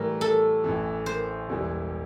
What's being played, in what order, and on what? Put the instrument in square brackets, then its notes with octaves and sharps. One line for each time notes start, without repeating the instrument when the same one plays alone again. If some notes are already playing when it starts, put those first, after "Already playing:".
Already playing: [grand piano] A2 E3 G3 [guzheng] A#4
[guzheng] A4
[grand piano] A1 A2 E3
[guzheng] C5
[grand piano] E1 E2 E3 G3